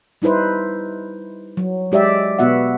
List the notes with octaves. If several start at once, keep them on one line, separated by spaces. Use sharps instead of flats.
G3 D#4 E4 B4 C5
F#3
G#3 G4 D5 E5
B2 B3 F#4 E5 F#5